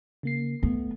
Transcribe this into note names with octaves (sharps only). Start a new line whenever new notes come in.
C#3 A#3 C7
A3 B3